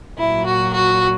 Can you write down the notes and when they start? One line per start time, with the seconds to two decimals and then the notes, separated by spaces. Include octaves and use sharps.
0.19 A#2 F#3 E4
0.47 F#4
0.75 F#4